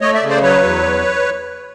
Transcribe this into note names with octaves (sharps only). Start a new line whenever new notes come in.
A3 C#5 D#5
D5 E5
C#3
C5 D5
F#3 B4 C#5
E2